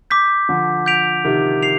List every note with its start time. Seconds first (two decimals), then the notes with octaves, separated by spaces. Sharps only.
0.10 D6 G6 B6
0.49 D3 F3
0.86 G6 B6 D7 F7
1.24 C3 D#3
1.63 C7 F7